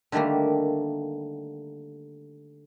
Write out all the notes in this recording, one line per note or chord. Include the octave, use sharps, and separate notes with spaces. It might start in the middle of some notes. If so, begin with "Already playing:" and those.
D3 D#3 G3 A3 A#3